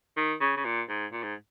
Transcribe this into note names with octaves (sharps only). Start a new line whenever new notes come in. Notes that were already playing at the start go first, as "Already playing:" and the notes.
D#3
C#3
C#3
A#2
G#2
A#2
G#2